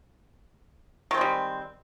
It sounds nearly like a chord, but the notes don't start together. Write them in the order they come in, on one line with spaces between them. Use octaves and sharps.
D#3 C4 G#3 G3